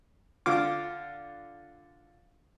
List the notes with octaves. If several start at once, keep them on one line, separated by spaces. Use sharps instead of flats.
D3 F4 D6